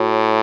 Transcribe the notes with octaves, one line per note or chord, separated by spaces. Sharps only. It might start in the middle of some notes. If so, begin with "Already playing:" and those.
Already playing: A2 F#4 C#5 E5